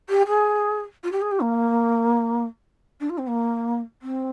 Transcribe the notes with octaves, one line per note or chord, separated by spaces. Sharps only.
G4
G#4
F4
G4
G#4
G4
A#3
D4
F4
C4
A#3
C4